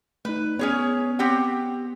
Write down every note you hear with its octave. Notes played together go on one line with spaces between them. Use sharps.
A3 D#4 B4
B3 C#4 G#4 C#5
C4 G4 F#5